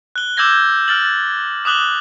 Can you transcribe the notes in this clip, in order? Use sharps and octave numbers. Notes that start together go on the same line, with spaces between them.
F#6 G7
D6 E6 G6 G#6 A#6 G7
F6 A6 F#7
D6 D#6 F#6 F#7 G7